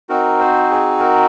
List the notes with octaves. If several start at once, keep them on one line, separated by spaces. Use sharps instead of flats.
C4 D#4 F#4 A#4
C5
G#4
A#4